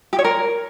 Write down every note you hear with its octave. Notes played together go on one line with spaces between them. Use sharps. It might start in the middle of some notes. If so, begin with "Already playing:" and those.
G4
C#5
A#4